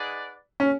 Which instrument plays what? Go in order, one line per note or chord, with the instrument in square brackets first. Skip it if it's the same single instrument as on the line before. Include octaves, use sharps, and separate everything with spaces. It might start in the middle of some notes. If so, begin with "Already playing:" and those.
Already playing: [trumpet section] D#4 G#4 B4 D5 F#5
[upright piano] C#4